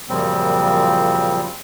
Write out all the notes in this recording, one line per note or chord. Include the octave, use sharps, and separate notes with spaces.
F#2 A#2 C#3 F3 G3 C4